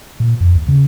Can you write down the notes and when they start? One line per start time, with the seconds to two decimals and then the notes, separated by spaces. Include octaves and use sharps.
0.20 A#2
0.41 F2
0.55 D#2
0.68 C#3